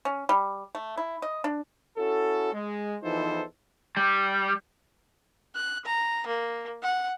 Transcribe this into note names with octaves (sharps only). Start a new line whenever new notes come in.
C#4
G3
A3
E4
D#5
D4
C#4 E4 F#4 A4
G#3
E2 E3 F3 D#4 A4 C5
G3
F#6
A#5
A#3
F#5